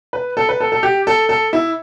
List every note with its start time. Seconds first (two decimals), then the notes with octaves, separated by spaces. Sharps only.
0.13 B4
0.37 A4
0.49 B4
0.60 A4
0.72 A4
0.83 G4
1.07 A4
1.29 A4
1.53 E4